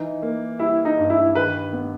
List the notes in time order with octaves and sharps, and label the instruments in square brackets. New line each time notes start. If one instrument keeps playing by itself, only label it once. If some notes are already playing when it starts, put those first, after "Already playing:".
Already playing: [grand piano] E3 [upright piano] D#4
[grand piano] A#3
[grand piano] G3 [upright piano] E4
[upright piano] D#4
[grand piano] G2
[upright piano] E4
[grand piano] D#3 [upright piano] B4
[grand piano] B3